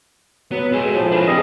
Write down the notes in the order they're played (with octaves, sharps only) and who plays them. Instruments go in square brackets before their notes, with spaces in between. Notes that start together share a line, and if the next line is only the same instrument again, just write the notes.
[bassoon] F#3 [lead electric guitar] B3 [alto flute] B4
[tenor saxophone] G#3 [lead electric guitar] A4 C#5 [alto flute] G#5
[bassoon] A2 [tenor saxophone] F3
[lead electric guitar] D4 F4 [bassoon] B4 [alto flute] C5
[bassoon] G3 [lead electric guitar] C4 D#4 [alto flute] G#4 [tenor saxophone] D#5